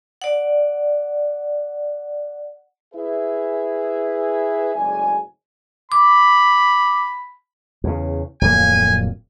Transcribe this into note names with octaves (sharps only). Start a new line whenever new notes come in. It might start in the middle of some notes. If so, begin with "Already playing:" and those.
D5 F#5
E4 G#4 B4 E5
F#1 D2 G#2 D5 G#5
B5 D6
E2 C#3
D1 F2 A#3 G#5